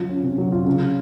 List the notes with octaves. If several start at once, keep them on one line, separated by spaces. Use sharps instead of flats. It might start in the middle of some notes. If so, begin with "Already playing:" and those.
Already playing: F#3 F4
C#4
C3
F#3
F4
C#3